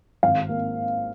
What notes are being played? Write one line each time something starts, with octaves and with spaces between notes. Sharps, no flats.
G#1 F5
A#3